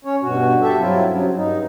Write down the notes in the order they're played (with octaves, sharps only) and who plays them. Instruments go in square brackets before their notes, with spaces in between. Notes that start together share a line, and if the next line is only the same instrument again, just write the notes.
[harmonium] C#4 C#5
G2 B2 F#4
G4 A4 E5
G2 F#3 C4 E4 F4
C#3 F#3
G2 D#4